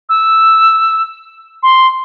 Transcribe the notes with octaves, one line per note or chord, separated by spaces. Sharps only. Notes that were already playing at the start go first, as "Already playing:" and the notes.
E6
C6